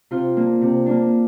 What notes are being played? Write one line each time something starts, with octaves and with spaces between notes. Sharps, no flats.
C3 F4
A#3 D4
C3
A#3 D4